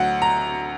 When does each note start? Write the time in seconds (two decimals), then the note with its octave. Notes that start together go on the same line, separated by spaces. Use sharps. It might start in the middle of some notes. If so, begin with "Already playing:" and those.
Already playing: D2 F#3 F#5
0.22 A#5